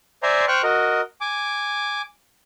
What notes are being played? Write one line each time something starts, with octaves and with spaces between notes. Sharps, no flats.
C5 D5 E5 G#5 A#5 C6
C5 G5 C#6 F6 F#6
F#4 A#4 D#5
G#5 D6